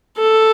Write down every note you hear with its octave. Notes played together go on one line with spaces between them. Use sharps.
A4